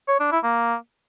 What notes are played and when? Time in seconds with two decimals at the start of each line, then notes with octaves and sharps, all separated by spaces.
0.08 C#5
0.20 D4
0.32 E4
0.43 A#3